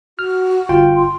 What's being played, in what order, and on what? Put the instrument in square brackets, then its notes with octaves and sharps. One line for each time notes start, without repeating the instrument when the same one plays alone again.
[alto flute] F#4 [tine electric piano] F6
[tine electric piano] G1 F4 G5
[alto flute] C6